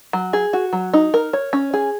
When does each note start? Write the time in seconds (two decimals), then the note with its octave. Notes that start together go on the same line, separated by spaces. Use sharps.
0.13 F#3
0.33 G#4
0.53 F#4
0.73 F#3
0.94 D#4
1.14 A#4
1.33 C#5
1.53 C#4
1.74 G#4